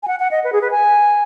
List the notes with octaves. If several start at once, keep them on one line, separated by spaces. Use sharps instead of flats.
G#5
F#5
F#5
D#5
B4
G#4
B4
G#5